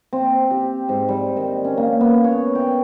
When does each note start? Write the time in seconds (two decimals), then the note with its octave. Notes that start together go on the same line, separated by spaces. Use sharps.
0.13 C4
0.51 G4
0.89 G#2
1.08 G3
1.37 D#3
1.64 C#4
1.78 A#3
2.01 B3
2.24 C#5
2.55 G5